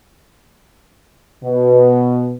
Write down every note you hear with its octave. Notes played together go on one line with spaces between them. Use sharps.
B2